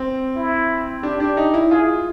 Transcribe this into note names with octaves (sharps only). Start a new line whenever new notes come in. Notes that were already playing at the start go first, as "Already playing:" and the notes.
Already playing: C4
E4
D4 G4
D4
D#4
E4
F4 G#4